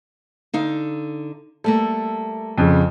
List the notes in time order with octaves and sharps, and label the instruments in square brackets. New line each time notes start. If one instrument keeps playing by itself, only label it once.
[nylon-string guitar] D3 D#4 F5
[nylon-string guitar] G3 A3 A#3 [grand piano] A4
[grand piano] F2 C#3